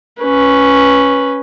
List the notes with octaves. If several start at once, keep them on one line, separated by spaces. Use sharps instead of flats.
C#4 B4